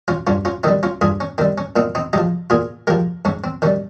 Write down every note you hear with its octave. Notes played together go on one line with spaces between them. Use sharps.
C#4 F4
G2 C#4 F4
C#4 F4
D#3 G3 C4 D#4
C#4 F4
G2 F4 G#4
C#4
D#3 G3 C4
C#4
A#2 C4 D#4
C4 D#4
F3 G#3 D#4 G4
A#2 F4 G#4
F3 G#3 G4 A#4
G#2 C#4
C4
D#3 G3 C#4